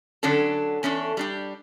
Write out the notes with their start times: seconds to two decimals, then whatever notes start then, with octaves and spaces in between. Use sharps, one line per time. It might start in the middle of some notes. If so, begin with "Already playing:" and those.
0.23 D3 F#3 C#4 D4 A4
0.83 E2 C#4 D4 A4
1.17 G3 D4 G4